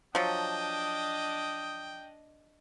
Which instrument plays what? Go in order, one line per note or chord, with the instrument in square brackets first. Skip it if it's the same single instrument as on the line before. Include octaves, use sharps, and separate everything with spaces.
[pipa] F3 F#3 [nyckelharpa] D4 D#5 [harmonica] G5 D#6